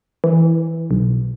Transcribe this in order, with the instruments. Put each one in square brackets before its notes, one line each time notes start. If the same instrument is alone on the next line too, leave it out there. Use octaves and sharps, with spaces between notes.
[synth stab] E3
B1